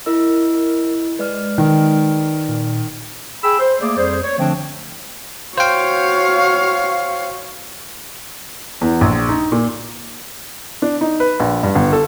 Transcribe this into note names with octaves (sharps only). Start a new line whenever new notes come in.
E4 A#4 D#5 E6
G#3 B4 D5 F6
D#3
A#2
G#4 G5 B5 E6
C5
A3 A#3 G#4 D5
F2 G3 G#4 C5
C#5
D3 F3 A3 C4 D4
F#4 C5 C#5 F5 G5
E2
A#1
D#4
A#2
D4
D#4
B4
A#1
G2
G1
A4